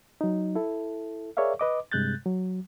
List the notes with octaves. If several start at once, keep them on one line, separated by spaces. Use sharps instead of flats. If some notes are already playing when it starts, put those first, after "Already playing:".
F#3 D#4
E4 A4
G#4 A#4 C#5 D5 E5 F5
B4 D#5 D6
G2 C3 G#3 F#6 G6 A6
F#3